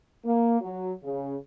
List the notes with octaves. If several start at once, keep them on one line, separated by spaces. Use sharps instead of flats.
A#3
F#3
C#3